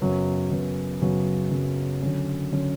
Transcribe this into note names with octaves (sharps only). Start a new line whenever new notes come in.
F#2 C#3 F#3 B3
F#2 C#3 F#3 B3
F#2 C#3 F#3 B3
F#2 C#3 F#3 B3
D3 F#3 C#4
D3 F#3 C#4